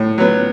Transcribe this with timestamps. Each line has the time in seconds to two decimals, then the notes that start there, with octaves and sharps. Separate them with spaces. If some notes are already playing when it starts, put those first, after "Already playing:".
Already playing: A2
0.18 F#3 B3